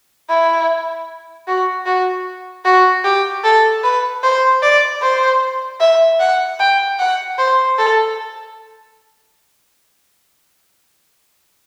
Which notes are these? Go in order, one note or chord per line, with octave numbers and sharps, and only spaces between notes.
E4
F#4
F#4
F#4
G4
A4
B4
C5
D5
C5
E5
F#5
G5
F#5
C5
A4